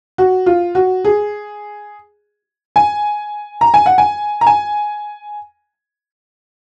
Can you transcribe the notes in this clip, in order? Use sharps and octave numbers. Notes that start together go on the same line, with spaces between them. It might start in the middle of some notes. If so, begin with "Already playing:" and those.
F#4
F4
F#4
G#4
G#5
A#5
G#5
F#5
G#5
A#5
G#5